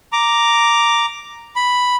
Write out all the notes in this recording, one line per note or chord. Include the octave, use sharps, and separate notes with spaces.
A#5 D6
B5